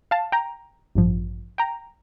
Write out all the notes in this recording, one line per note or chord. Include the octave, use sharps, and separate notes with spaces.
F5 A5
G5 A#5
A1 G2 F3
G5 A#5